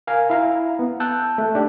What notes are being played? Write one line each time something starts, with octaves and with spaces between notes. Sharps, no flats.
A#4 F5 G#5
E4 F5 A#5
B3
A5 E6 F#6 G6
A3
D4 G4 D5